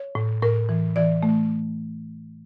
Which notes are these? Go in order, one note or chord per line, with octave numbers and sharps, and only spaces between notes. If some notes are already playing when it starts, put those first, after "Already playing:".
Already playing: C#5
A2
A2 A#4
E3
E3 D5
A3